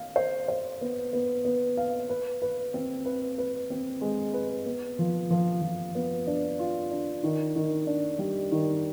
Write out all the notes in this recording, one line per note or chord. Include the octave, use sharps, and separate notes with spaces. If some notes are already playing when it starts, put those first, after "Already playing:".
Already playing: F5
C5
C5
B3
B3
B3
F5
B4
B4
C4
B4
B4
C4
G#3
B4
B3
F3
F3
F3
B3
D4
F4
D4
D#3
D#3
D4
G3
D#3